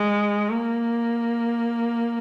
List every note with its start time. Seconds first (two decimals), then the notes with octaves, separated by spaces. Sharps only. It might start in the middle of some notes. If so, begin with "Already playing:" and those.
Already playing: G#3
0.50 A#3